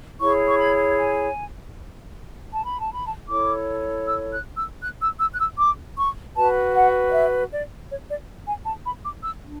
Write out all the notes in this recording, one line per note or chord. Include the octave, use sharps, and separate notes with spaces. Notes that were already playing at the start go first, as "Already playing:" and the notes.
E4 G#4 C#5 C#6
C#6
B5
G#5
A5
B5
A5
B5
A5
E4 A4 C#5 D6
E6
F#6
E6
F#6
E6
E6
F#6
E6
D6
C#6
F#4 B4 A5
F#5
D5
E5
D5
C#5
D5
G#5
A5
B5
D6
E6
D4